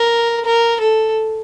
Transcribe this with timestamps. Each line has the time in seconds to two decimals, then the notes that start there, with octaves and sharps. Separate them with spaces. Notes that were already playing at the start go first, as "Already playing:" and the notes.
Already playing: A#4
0.45 A#4
0.81 A4